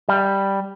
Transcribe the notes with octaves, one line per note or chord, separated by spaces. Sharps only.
G3